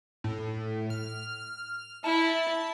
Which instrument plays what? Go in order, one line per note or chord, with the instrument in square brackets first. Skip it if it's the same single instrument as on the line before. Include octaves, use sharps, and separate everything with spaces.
[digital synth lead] A2
F6
[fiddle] E4 [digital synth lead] A5